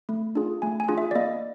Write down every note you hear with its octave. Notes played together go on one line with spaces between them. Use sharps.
A3
D4 F4 G#4
A3 G#5
G#5
D4 F4 G#4
E5
D5
A#3 D#5